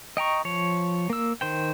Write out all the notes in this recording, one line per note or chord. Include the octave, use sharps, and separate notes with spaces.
D#5 G5 A#5 C#6
F3 C#5
A#3 E6
D#3 C5 G5